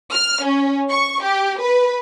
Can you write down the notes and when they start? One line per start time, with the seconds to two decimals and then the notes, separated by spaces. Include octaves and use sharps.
0.13 F6
0.44 C#4
0.90 C#6
1.22 G4
1.60 B4